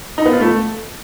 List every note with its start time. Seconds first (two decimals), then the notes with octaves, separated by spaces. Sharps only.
0.18 D#4
0.26 B3
0.33 F4
0.41 A3